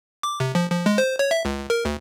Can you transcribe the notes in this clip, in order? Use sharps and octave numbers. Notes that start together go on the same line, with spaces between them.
D6
C3
F3
F3
G#3
C5
C#5
E5
C#2
A#4
D2